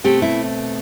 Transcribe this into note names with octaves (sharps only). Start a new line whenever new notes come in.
B2 A3 C4 G4
E4